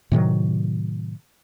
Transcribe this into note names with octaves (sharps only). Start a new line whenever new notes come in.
A2 C3 D#3 F#3